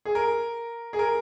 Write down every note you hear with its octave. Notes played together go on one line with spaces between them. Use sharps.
G#4
A#4
G#4
A#4